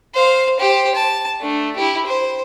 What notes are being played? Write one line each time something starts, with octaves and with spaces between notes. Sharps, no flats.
C5 F5
G4 C5
A5
A3 D4
E4 G4
C5